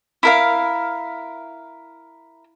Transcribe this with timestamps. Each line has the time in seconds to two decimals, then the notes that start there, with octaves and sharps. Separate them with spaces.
0.23 E4 A#4 F5